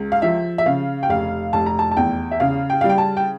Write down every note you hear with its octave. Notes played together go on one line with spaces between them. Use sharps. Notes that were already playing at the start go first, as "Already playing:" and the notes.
Already playing: C#2
F5
F3 E5
E5
C#3 F5
G5
F1 F5
F1 A5
A#5
A5
A5
E2 G5
E5
C#3 F5
G5
G3 F5
G5
A5
G5